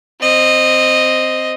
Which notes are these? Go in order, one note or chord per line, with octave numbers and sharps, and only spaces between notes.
C4 D#5